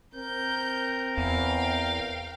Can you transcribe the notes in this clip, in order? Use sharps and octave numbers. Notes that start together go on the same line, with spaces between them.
C4 A#4 G6
E2 F5 G5